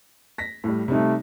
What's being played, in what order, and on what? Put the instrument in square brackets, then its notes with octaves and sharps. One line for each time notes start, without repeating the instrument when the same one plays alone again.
[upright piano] A#6 B6
A2 G3
[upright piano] C3 G3 D#4 [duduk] A3